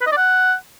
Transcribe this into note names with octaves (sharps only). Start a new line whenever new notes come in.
B4
D#5
D5
F#5